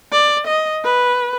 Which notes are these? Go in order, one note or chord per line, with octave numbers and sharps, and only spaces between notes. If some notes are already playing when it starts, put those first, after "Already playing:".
D5
D#5
B4